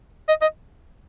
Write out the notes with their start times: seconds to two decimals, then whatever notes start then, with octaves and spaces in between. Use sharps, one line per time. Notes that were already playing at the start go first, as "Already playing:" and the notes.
0.28 D#5
0.41 D#5